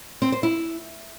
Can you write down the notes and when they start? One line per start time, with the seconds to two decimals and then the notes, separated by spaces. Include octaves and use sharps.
0.22 C4
0.32 C5
0.43 E4